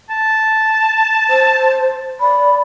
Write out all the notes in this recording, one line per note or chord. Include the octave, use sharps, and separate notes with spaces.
A5
C5
D5 B5